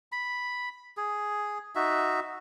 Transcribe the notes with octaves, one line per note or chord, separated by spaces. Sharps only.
B5
G#4
D#4 F#4 E5